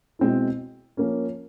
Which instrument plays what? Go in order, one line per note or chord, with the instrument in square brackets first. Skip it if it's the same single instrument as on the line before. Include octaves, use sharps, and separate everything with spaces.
[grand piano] B2 G#3 C4 E4
F3 A#3 C#4